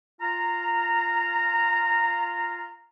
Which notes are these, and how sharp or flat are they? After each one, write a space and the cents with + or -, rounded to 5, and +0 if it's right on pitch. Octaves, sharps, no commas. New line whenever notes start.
F4 +0 A#5 -15